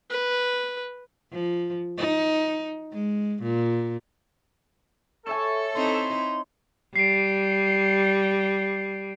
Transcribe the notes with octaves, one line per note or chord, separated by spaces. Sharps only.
B4
F3
D#4
G#3
A#2
A4 C#5 E5 G#5
C4 D#4 E4 C6
G3 C7 D7